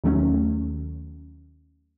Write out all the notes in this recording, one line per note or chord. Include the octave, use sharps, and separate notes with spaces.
D#2 D#3 F#3 A3 C#4